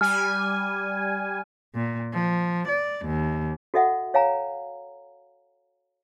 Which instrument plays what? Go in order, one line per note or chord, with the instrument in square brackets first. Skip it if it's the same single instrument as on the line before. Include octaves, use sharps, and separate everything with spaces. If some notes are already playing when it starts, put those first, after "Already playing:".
[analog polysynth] G3 G#5 [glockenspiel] F6
[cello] A#2
F3
D5
D#2
[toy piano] F#4 A4 D#5 E5 F#5
C#5 F5 G#5 A#5